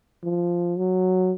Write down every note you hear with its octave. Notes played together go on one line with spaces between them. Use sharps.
F3
F#3